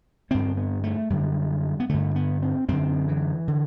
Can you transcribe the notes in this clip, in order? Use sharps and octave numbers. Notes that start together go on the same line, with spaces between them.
G2 D3 C4
B3
A3
F#2 D3 G3
B3
G2 D3 A3
B3
C4
F#2 D3 C4
E3
D3